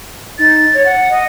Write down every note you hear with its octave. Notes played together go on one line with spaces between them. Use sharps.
D#4 A6
C#5
F#5
D#5